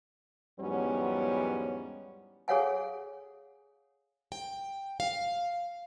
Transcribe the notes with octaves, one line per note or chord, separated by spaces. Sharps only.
E2 G#2 F#3 G3 B3 C#4
G#4 A4 C#5 F5 F#5 G#5
G5
F5